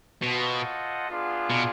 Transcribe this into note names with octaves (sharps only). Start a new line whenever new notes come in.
B2 F4 A4 C5 D#5 F#5
B3 D4 F4 G#4
B2